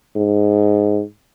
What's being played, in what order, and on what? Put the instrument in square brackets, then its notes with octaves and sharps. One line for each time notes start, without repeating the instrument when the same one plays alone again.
[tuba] G#2